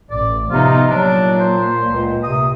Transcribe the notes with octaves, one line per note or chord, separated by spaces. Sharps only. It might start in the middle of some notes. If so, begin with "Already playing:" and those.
A1 D5
C3 F3 B3 D#4 F4
A#2 F#3 D4
C5
C#2
C3 D#6